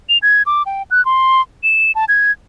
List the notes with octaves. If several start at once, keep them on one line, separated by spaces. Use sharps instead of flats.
F7
G#6
D6
G5
F#6
C6
E7
A5
G#6